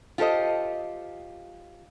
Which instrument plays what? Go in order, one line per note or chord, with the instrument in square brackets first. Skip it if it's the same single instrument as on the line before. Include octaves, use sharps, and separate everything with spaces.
[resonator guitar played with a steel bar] F4 G4 A4 C5 D#5